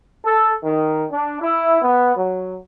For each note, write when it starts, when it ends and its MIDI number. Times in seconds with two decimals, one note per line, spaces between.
0.24 0.52 69
0.63 1.04 51
1.11 1.37 62
1.39 1.82 64
1.82 2.13 59
2.16 2.57 54